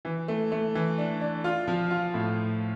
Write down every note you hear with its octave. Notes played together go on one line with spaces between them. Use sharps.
E3
A3
A3
E3
D4
D4
F4
F3
F4
A2